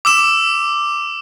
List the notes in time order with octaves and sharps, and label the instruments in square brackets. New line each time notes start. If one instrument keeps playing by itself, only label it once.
[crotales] D6 E6 E7